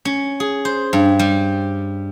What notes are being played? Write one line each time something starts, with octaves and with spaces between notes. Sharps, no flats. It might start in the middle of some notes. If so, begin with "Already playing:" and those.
C#4
G#4
C5
G2
G3